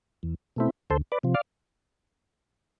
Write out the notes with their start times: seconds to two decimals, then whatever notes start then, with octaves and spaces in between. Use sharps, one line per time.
0.23 E2
0.56 B2 A3 C4 E4
0.90 D2 A4 C5
1.12 B4 D5
1.23 C3 F3
1.34 D5 F5